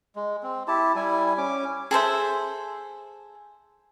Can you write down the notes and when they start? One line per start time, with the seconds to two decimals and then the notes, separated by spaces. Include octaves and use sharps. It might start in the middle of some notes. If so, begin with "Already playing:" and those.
0.16 G#3
0.43 C4
0.68 E4 G4 A5
0.96 G3 E4 G#5
1.38 C#4 D6
1.91 G#4 A4 C5 E5